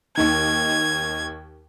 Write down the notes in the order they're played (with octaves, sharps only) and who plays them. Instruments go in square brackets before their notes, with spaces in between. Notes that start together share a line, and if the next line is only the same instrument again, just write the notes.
[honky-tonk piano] D#2 D#3 [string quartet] G#6